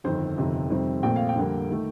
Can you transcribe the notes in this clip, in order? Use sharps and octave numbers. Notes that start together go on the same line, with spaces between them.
G1 F2 D#3 C5
G1 F2 C3 D#3
F2 C3 D#3 G3 C4
A#1 A#2 A3 C4 G5
F5
G5
F2 D3 G3 A#3
D#3 A3